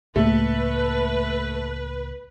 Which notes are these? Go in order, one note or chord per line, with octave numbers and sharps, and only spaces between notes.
C#2 A2 A3 A#3 B4